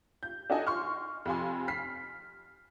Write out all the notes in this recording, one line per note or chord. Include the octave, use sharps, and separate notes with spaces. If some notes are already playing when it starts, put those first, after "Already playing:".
G6
D4 D#4 F#4 A4 D#5 G#5
C6 C#6 F6
F2 C3 F5 G#5 C6
F6 B6 C7